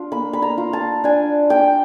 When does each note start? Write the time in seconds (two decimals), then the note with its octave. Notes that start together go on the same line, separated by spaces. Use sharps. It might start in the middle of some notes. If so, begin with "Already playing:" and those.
Already playing: D4 F4
0.12 A#3 B5
0.33 B5
0.42 A#5
0.58 F4
0.73 A5
1.04 D4 G#5
1.50 D4 G5